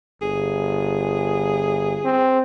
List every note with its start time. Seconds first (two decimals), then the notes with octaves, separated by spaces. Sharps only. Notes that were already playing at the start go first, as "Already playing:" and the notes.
0.22 G1 G#4
2.04 C4